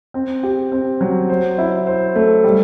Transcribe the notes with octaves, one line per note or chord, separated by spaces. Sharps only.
C4
G4
C4
F#3
C5
E4
C5
A3
G3